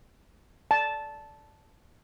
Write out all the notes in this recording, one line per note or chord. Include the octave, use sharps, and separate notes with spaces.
A5